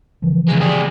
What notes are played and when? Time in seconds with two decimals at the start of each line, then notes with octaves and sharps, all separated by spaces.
0.22 C#3 E3 F3
0.48 C#2 G#3
0.60 G3 G#4